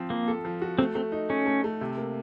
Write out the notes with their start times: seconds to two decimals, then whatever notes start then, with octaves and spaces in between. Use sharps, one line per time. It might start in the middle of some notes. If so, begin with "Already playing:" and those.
Already playing: F3 C4
0.10 F3 A#3
0.28 A4
0.45 F3
0.62 F#4
0.79 A3 C4
0.95 A3 C4
1.12 D#4
1.29 A3 C#4
1.46 A3
1.64 A3
1.81 C3
1.97 A#3